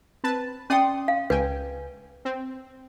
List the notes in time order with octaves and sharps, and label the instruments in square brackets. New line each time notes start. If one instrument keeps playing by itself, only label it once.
[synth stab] C4 B4 A5
[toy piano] C#4 G5 [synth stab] D5 C6 D#6
[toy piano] F5
[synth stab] C#2 G5 G#5 [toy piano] B4
[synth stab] C4